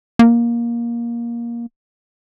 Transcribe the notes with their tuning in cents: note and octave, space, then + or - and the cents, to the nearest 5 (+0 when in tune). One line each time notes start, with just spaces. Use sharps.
A#3 +15